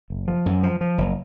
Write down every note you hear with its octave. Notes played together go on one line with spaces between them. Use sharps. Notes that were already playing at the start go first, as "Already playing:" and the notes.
F#1
F3
F#2
F3
F3
F#1